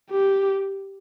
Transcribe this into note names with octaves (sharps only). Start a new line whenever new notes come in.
G4